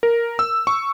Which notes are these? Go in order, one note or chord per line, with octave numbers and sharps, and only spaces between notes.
A#4
E6
C#6